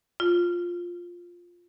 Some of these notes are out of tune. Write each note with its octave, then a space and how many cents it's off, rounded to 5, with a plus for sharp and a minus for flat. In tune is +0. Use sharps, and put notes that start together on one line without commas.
F4 +5